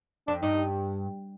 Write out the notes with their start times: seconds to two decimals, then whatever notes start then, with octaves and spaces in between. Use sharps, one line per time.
0.28 F2 D4
0.42 G2 D#4